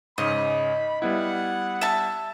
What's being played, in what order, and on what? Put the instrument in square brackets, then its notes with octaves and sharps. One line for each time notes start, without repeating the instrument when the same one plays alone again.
[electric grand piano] G#2 C#3 [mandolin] D#5 [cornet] B5
[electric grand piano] G3 B3 E4 [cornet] F#5
[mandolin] E5 A5